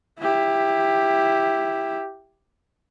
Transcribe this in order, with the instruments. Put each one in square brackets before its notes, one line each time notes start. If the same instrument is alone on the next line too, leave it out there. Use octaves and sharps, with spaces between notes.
[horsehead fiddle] E4 G4